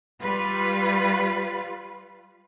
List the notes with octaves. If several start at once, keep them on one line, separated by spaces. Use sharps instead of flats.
G3 F4 B4